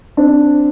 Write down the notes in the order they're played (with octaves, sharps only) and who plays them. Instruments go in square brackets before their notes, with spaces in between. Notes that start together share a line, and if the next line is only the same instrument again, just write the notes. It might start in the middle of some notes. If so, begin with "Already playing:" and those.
[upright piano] C4 D4